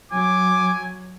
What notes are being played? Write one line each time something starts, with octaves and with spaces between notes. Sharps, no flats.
F#3 G#5 D6